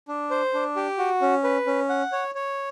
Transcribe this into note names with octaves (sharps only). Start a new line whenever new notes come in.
D4
C5
D4
G4
F#4
C#4
B4
C#4
F#5
C#5
C#5